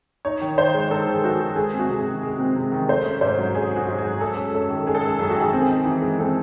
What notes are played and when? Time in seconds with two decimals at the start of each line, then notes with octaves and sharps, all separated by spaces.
0.25 D#4 C#5
0.42 D#3
0.58 D#3 C5
0.74 G#3
0.91 D#4 A4
1.07 D#3
1.13 G#4
1.24 D#3 F#4
1.41 G#3
1.56 G#3 G#4
1.74 C4
1.79 F#4
1.89 C3
2.00 G#4
2.06 D#3
2.23 G#3
2.39 C4
2.56 C3
2.72 D#3
2.88 A3 C5
3.06 C#4
3.21 G#2 C5
3.38 F#3
3.55 A3 G#4
3.72 C#4 F#4
3.88 G#2
3.99 G#4
4.04 F#3
4.21 G#3 A4
4.37 C#4
4.54 F#2 A4
4.70 D#3
4.86 G#3 G#4
4.95 A4
5.03 C#4 G#4
5.19 F#2 G#4
5.30 F#4
5.36 D#3 G#4
5.53 C4
5.70 D#4
5.85 E3
6.02 G#3
6.19 C4 A4